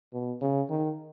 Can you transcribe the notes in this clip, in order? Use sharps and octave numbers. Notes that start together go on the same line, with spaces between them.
B2
C#3
D#3